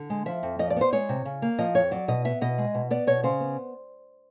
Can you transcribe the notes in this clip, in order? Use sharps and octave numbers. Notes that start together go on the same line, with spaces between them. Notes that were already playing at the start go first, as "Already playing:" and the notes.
Already playing: D3
G#3
F3 E5
F2
F3 D#5
D5
B3 C5
G#3 C#5
C3
C#3
A#3
F3 D#5
F2 C#5
F#3 D5
B2 D#5
B3 E5
B2 D#5
G#3
B2
B3 D5
B2 C#5
C#3 C5
B3